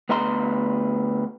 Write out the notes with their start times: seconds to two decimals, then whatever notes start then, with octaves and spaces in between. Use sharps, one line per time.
0.09 D2 B3 D#5 A#5 C6